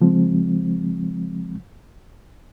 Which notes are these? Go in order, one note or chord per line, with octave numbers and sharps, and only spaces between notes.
C#3 F3 G#3 C4